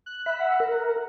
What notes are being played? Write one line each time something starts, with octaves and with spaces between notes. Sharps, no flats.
F#6
E5 B5
F#5
A#4